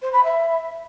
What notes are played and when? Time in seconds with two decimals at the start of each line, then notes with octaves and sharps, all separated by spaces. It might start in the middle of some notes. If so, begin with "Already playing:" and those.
0.02 C5
0.13 B5
0.23 E5